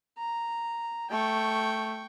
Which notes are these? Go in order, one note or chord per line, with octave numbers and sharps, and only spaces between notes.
A#5
A3 G5 C#6